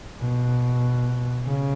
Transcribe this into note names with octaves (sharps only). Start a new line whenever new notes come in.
B2
C#3